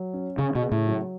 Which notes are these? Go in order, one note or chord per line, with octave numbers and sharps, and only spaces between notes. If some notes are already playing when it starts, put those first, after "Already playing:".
Already playing: F#3
C#4
C#3 G#4
B2
C#3
A2
F#3